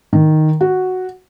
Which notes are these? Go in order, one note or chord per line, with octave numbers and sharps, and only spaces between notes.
D#3
F#4